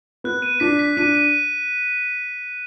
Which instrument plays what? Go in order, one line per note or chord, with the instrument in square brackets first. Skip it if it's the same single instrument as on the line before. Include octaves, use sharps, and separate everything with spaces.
[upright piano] B3 [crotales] F#6
[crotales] D#7
[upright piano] D4 [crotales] B6
[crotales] B6
[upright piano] D4 [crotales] D#7
[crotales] D#7